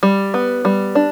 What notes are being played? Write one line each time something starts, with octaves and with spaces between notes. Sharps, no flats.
G3
B3
G3
D4